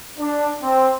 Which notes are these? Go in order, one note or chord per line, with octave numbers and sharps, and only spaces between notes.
D4
C4